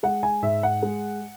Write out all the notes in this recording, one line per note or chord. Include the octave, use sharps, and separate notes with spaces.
G#3 F#5
G#5
G#2 E5
F#5
G#3